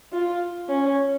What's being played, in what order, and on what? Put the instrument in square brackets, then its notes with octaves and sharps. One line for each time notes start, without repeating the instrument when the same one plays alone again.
[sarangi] F4
C#4